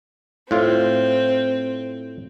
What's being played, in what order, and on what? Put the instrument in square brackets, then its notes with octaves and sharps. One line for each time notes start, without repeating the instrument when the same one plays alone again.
[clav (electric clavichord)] A2 F4 F5 [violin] C4